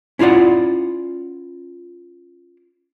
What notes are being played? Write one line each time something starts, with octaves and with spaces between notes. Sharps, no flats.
C#4 E4 F4 D5 F#5